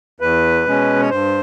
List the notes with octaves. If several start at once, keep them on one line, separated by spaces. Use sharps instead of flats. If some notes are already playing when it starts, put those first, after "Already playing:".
E2 B4
B2 G#3 C#4
C#5
G2 C5